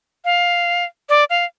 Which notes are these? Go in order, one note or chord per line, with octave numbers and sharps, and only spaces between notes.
F5
D5
F5